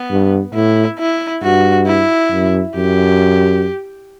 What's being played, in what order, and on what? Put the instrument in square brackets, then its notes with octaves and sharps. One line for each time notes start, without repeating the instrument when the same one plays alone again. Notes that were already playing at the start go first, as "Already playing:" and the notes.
Already playing: [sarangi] B3
[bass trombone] G2
[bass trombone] A2 [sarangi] E4
[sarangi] E4
[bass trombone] G2 [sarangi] F#4
[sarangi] E4
[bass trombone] F#2
[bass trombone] F#2 [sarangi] G4